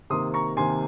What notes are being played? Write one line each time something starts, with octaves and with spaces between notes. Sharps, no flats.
C3 D#3 A#3 C6 D#6
A#5 C#6
C3 D#3 A#3 G#5 C6